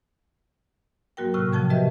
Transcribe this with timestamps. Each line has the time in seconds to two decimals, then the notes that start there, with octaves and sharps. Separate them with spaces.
1.17 G#2 F#3 A#3 F#4 A#4 G5
1.34 A2 C3 G5 C#6 F6 F#6
1.53 C#3 F3 G5 A5 G#6
1.70 F#4 G4 A#4 B4 D#5 E5